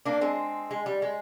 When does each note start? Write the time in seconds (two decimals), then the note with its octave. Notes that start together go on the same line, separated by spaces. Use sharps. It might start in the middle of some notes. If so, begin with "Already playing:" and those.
0.05 A#3 D4
0.21 G#3 C4
0.71 G#3
0.86 G3
1.02 G#3